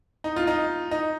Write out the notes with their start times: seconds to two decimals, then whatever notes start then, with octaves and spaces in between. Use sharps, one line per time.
0.24 D#4
0.36 F4
0.47 D#4
0.91 D#4